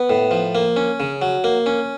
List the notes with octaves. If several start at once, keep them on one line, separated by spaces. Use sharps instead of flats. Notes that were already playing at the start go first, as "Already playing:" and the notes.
Already playing: B3
A2
F3
A#3
C#4
C#3
F#3
A#3
C#4